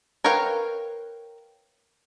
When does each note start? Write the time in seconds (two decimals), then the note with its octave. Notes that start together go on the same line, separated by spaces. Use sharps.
0.24 A#4 B4 C#5 F5 G5